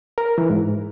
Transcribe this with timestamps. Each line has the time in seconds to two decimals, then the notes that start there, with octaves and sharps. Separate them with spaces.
0.18 A#4
0.38 E3
0.50 G#2